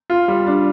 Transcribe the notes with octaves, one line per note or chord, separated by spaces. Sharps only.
F4
G3
D4